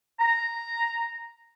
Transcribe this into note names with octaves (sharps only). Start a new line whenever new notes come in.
A#5